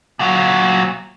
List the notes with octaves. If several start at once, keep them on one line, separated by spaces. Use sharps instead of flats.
A#2 F#3